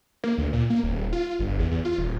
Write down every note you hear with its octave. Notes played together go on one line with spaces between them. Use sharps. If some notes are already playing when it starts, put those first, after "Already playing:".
A#3
D2
A#2
A#3
D#1
F4
G1
E2
E2
F4
D#1